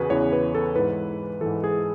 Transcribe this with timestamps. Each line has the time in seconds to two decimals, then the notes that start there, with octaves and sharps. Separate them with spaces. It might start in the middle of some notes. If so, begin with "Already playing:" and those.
Already playing: E2 C#3 E3 F#4 G#4 B4
0.10 E2 C#3 E3 C#5
0.33 B4
0.55 A4
0.76 G#2 E3 B4
1.41 G#2 E3 A4
1.64 G#4